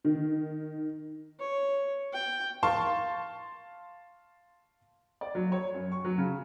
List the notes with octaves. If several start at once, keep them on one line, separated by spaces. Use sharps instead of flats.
D#3
C#5
G5
F5 A5 C6 C#6
D5
F#3
C#5
F#2
C#6
F#3
C#3